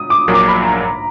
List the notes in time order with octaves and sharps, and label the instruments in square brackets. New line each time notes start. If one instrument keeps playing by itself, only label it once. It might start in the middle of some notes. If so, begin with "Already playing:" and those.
Already playing: [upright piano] D#6
D6
[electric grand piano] A#1 A#2 F#3 A#3
[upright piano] D6
B5
A#5